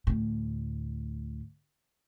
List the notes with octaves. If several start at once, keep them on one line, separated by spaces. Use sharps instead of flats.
D2 A2